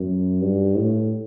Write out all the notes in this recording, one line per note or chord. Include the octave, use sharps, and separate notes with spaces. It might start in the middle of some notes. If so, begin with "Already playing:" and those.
Already playing: F#2
G2
A2